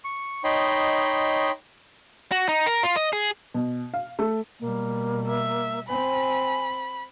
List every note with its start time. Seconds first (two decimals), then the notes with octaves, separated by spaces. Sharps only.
0.05 C#6
0.44 D#4 C#5 D#5 G5 B5 C6
2.32 F#4
2.49 D#4
2.66 A#4
2.83 F4
2.96 D#5
3.13 G#4
3.54 B2
3.94 F5
4.19 A3
4.60 B2 G3 A#3
5.28 E5
5.88 C4 G#5 B5